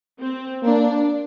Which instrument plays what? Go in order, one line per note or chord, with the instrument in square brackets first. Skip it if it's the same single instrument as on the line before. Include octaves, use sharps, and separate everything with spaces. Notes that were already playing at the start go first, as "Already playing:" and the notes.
[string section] C4
[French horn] A#3 [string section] D4